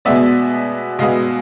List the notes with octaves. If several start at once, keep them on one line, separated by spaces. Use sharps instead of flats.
B2 G#3 B3 D5 E5
B2 G#3 B3 D#5 F5